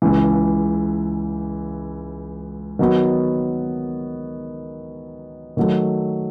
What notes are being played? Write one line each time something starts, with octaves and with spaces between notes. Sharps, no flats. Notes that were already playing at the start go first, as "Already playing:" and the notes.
C#2 C#3 E3
D#3 F#3 B3 F#4
D#3 F#3 A3